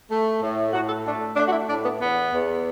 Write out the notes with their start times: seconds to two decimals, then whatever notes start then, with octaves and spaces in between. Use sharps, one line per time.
0.09 A3
0.42 A2
0.73 A2 F#4
0.89 A4
1.05 A3 D4
1.36 A3 D4
1.48 F#4
1.52 E4
1.68 A2 D4
1.85 B3
2.01 E2 B3
2.33 E2